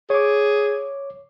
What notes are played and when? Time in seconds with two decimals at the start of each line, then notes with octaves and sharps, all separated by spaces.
0.10 G#4 C#5 D6